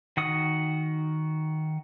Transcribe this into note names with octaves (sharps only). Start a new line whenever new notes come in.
D#3 F#4 D#6